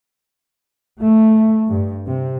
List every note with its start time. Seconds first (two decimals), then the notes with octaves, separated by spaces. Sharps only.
1.01 A3
1.69 G2
2.06 C3